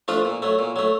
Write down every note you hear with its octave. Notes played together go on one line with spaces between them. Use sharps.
F3 A3 D4 F4
A#2
F#3 A3
A#2
F#3 A3